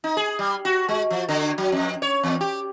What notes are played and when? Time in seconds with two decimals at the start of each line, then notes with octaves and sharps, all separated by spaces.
0.04 D#4
0.17 G#4
0.39 G3
0.65 F#4
0.88 G#3
1.10 F3
1.28 D3
1.58 F#3
1.72 F2
2.02 C#5
2.23 E2
2.41 G4